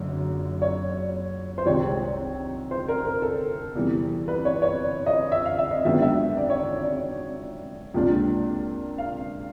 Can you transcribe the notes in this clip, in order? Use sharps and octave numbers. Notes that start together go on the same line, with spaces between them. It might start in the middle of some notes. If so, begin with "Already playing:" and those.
Already playing: F#1 F#2 D3
C#5
C5
C2 C3 D#3 G#3 C#5
C5
A#4
A#4
A4
E2 C3 E3 G3
B4
C#5
C#5
D5
D#5
E5
F5
E5
D#5
G#2 D#3 F#3 B3 D4 E5
E5
D5
C#5
D5
D5
C#2 C3 F3 A#3 D4
F5